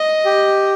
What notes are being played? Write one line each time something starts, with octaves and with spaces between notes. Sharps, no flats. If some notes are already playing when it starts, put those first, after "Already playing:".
Already playing: D#5
G4